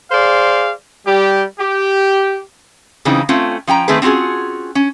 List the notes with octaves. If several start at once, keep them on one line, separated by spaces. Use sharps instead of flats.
G#4 C5 D5 F5
G3 G4
G4
C#3 E3 F#3 C4 D#4
A3 C4 C#4 F4
F3 C#4 G5 A#5
D#3 A3 C4 G#4 B4
C4 C#4 F4 F#4 G#4
C#4